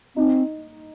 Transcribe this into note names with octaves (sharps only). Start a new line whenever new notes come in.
C4 D#4